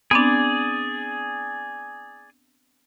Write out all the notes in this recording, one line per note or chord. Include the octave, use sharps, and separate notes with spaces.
B3 C4 D4 G#4 D5